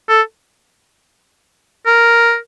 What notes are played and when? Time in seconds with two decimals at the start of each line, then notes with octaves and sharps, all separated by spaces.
0.09 A4
1.86 A#4